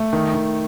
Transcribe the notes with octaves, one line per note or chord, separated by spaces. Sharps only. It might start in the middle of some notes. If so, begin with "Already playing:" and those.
Already playing: A3
D#3
D#3